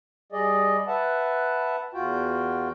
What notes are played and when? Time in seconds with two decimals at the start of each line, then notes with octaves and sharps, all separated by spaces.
0.32 G3 G#4 D5 D#5
0.88 B4 E5 F#5 A5
1.94 E2 F4 F#4 G5